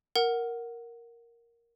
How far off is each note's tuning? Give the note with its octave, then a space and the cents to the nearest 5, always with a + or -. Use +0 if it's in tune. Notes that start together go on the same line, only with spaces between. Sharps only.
A#4 +0 F#5 +0